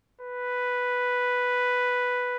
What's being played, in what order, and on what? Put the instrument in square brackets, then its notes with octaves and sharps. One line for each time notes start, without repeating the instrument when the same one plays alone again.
[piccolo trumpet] B4